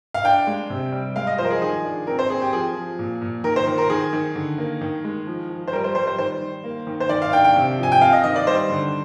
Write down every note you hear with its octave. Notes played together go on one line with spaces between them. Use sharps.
F5
D4 G5
G#3
C3
G3
G#3 F5
D#5
F3 C5
A#4
G#4
D#3 G#4
D4
C4 A#4
C5
C4 G#4
G4
F3 G#4
F3
A#2
A#2
D#3 A#4
C5
D#3
A#4
D#3 G#4
D#3
D3
A#3
D#3
G#3
F3
F3
C5
G3 A#4
C5
G3 C5
C5
D#3 C5
D#3
A#3
D#3
C5
D#3 D5
F5
D4 G5
G5
C3
F3 G#5
G5
C4 F5
D#5
D#3 D#5
D5
G3 C5
D3